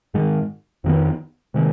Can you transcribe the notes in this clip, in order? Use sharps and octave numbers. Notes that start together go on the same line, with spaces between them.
G#2 D#3 G#3
F2 D#3 B3
C3 D#3 G#3